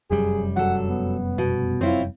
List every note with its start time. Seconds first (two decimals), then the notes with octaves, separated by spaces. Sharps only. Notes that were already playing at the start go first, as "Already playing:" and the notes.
0.11 F1 F#2 G3 G#4
0.56 F#3 A4 F#5
0.89 B3
1.38 B2
1.81 C4 E4 F4 C#5